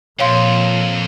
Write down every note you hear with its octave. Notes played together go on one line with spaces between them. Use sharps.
F2 A#2 F3 C#5 F5 C6